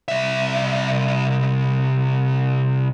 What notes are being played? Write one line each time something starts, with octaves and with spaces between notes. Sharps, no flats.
C2 E5